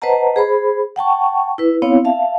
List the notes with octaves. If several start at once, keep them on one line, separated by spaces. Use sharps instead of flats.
B4 C5 D#5 F#5 A5 A#5
G#4 C5 B5
F#5 G5 A5 C#6
E4 B4
B3 C4 E4 C#5 F5
E5 F5 A5